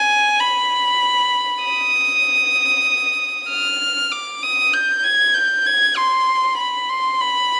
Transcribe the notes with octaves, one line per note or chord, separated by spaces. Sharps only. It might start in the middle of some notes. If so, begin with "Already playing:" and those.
Already playing: G#5
B5
D#6
F6
D6
D#6
G6
G#6
G6
G#6
C6
B5
C6
B5